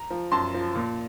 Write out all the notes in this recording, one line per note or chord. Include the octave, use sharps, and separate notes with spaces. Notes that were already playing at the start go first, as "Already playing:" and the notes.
Already playing: A#5
F3
F#2 A5 C6
F3
A#2